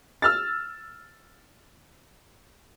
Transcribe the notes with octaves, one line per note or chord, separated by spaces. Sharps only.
E6 F6 A6